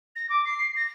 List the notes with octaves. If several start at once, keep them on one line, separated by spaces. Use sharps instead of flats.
A#6
D6
C7
A#6